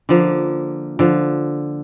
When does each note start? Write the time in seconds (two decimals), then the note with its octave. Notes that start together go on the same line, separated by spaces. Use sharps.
0.09 D3 F3 A#3
0.99 D3 F3